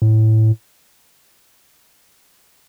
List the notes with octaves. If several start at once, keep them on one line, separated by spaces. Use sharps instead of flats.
A2